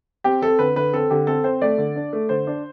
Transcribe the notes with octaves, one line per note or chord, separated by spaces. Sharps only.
C4 G4
C4 A4
D3 B4
D3 B4
C4 A4
D3 G4
C4 A4
C4 C5
A3 D5
D3
D4
A3
D3 C5
D4